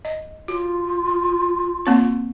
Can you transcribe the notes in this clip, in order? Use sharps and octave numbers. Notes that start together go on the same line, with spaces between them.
D#5
F4 F#4
A#3 C4 C#6